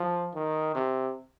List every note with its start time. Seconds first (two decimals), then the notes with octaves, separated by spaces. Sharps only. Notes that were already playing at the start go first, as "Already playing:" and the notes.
Already playing: F3
0.35 D#3
0.75 C3